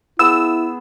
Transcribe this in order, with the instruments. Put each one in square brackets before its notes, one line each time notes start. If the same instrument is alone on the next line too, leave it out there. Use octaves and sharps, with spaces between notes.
[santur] B3 G#4 [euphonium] E4 [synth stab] E6